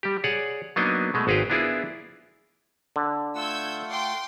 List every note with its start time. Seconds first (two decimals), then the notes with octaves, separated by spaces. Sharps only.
0.03 G3 G4
0.24 G#4 C#5 D5 F#5
0.76 F#3 A#3 B3 D4 D#4 D#5
1.14 B2 G#3 A3
1.27 G#1 F#4 G#4 B4 F5 G5
1.50 B3 D4 E4 F4 G#4 A#4
2.96 D3
3.35 A3 F4 F#5 E6 G6 G#6
3.90 G5 C6 D6